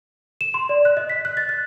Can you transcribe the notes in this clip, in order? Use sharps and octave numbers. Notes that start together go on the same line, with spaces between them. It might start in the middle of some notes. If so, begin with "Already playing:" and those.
E7
C6
D5
F#6
D#5
B6
F#6
A6
F#6